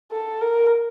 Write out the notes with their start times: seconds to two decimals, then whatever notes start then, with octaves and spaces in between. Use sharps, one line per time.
0.12 A4
0.41 A#4